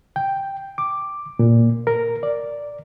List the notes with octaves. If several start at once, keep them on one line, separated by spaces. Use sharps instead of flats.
G5
D6
A#2
A#4
D5